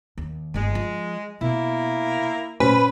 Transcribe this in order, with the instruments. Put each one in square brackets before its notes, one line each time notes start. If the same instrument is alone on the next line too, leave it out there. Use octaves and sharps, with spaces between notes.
[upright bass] D#2
[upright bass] G1 D#3 [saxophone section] G#3
[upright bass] F3
[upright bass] B2 [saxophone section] A#3 E4
[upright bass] A#2 [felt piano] C#4 C5 [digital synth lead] B4